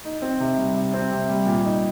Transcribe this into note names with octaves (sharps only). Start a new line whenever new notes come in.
D#4
C4
C3
G3
C3
C4
C3
G3
A#2
D#4